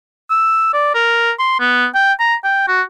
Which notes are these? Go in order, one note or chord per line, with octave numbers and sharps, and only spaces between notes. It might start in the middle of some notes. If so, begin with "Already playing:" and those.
E6
D5
A#4
C6
B3
G5
A#5
G5
F#4